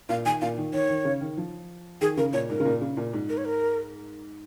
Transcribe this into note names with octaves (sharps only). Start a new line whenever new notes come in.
A#2 F5
D#3 G#5
A#2 F5
D#3
D#3 C#5
D#3
C#3
D#3
F3
D#3 G#4
C#3 A#4
A#2 C#5
G#2 A#4
C#3
A#2
C#3
A#2
G#2
A#4
C#5
A#4